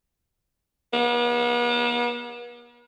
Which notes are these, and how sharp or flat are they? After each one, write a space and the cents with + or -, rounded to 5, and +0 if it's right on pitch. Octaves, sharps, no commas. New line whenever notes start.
B3 -45